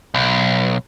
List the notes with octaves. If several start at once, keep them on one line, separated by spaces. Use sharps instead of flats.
B1